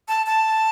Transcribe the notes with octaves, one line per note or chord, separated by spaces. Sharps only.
A5
A5